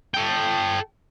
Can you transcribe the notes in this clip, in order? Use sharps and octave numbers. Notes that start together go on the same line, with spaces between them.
A4 G5